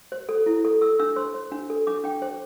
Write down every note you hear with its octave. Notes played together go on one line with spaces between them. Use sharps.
C5
A4
E4
A4
A4 E6
D4 E6
C5 C6
C5
D4
A4
D4 D6
D4 G5
C5